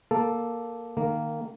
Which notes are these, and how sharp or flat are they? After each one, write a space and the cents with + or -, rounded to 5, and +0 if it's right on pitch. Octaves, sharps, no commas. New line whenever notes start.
A#3 +5 A4 +0
D#3 -20 A#3 -10